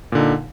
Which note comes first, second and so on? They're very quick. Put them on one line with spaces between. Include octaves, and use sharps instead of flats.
A#2 D3 D#4